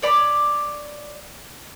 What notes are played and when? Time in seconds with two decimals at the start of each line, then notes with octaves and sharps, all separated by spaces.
0.02 C#5 D5 B5